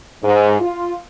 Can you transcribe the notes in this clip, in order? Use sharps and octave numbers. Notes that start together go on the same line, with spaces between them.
G#2
F4